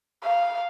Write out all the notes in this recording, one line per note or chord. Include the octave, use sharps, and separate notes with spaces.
F5